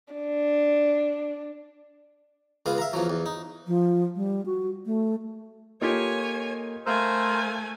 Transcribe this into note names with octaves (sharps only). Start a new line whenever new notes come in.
D4
C#2 G#3 B3 F5
E5 F5 A#5
E2 F3 F#3
E2
D#4
F3
G3
F#4
A3
A#3 D#4 F4 G4 A4 A#4 C#5 G#5
A3 A#4 C5 E5 F5 G#5 E6